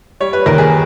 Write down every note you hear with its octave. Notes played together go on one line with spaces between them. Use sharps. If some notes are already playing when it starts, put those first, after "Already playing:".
G3 C#5
B4
D#2 A#4
G#4